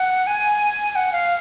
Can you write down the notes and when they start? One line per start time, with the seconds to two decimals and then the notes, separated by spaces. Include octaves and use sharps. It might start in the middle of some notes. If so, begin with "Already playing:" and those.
Already playing: F#5
0.27 G#5
0.91 G#5
0.96 F#5
1.12 F5